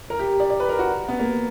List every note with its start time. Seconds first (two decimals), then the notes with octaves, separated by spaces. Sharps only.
0.10 A#4
0.19 G4
0.40 D5
0.50 D5
0.60 B4
0.69 A#4
0.79 F#4
1.08 B3
1.19 A#3